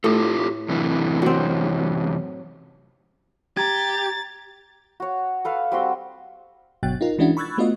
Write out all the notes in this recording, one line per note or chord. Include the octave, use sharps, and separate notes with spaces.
A2 F4 G4 A4
F#2 C3 E3
F#3 C4
G4 A#5 G#6 A6
F#4 C#5
A4 B4 F5
G3 C4 F#4 C6
G1 B2 F#3 G5 F#6 A6
D#4 F4 A#4
E3 G#3 C#4 D4 E4 F#4
B5 C#6 E6 F#6 G#6 A6
A3 B3 D4 F4 F#4 D#5